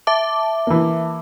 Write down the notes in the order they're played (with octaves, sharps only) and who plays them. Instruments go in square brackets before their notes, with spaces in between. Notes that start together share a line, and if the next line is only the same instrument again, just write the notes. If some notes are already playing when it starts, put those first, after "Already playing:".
[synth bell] E5 A5 D6
[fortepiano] E3 A#3